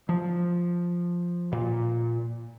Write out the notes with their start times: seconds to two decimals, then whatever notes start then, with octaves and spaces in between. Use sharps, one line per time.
0.09 F3
1.52 A#2